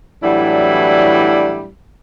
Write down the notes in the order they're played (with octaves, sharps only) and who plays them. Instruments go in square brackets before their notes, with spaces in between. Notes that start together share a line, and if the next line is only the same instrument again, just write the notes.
[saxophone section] A2 E3 F#3 G3 D4 E4